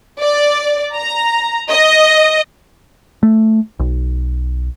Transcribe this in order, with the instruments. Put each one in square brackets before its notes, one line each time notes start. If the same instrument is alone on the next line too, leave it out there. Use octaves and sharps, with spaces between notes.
[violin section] D5
A#5
D#5
[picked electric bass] A3
B1